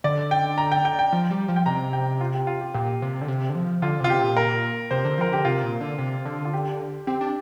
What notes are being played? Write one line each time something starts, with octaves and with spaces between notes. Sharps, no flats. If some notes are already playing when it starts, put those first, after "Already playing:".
D3 D5
G5
A#5
G5
G5
G5
F3
G3
F3
G5
C3 A#5
G5
F4
G4
F4
G4
A#2 G4
C3
D3
C3
D3
F3
D3 F4
C3 F4
G4
A#2
A#4
C3 C5
D3
F3 A#4
D3 G4
C3 F4
A#2
D3
C3
D3
F4
G4
C4 G4
D4